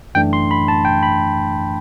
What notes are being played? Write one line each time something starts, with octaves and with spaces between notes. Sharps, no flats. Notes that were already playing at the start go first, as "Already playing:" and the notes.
F#2 E3 A3 D4 G5
C6
B5
A5
G5
B5